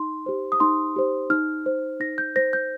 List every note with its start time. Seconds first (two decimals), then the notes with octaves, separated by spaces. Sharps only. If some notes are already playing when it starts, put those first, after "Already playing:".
Already playing: D#4 C6
0.26 G4 C5
0.52 D#6
0.60 D#4 C6
0.96 G4 C5
1.30 D#4 F6
1.66 C5
2.00 D#4 A#6
2.18 G6
2.36 C5 A#6
2.53 G6